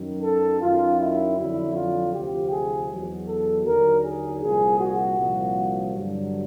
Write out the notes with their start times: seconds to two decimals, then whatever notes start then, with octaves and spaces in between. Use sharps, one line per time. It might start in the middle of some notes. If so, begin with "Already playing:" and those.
Already playing: F#2 D#3 F#3
0.23 A4
0.61 F#2 D#3 F#3 F4
0.99 E4
1.37 F2 D3 F#3 E4
1.75 F4
2.13 D2 C3 F3 G4
2.51 G#4
2.89 E2 B2 F#3
3.28 A4
3.65 D#2 D3 F#3 A#4
4.03 G#4
4.42 C2 A#2 F3 G#4
4.80 F#4
5.18 C2 A#2 F3
5.94 G2 D3 F#3